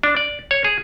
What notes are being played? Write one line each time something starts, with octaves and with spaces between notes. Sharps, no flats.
D4
D5
C#5
G#4